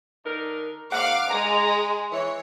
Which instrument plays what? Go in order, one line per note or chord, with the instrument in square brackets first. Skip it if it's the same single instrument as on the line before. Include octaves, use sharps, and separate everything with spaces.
[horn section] D3 D#4 A#4
[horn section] G#2 A#3 F#5 [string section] F5 D6
[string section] G#3 [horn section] A#5
[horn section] E3 [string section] C#5